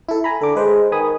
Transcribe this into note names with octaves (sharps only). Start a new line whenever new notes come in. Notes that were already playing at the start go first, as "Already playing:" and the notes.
E4 A4
G#5 A#5 B5
D3 A4 D6
G#3 G#4 B4 C5
D#3 G#5 B5 D#6